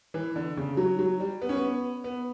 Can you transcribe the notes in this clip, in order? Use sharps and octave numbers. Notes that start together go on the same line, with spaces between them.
E3
D3
C#3
F#3
F#3
G3
B3
C#4
B3
B3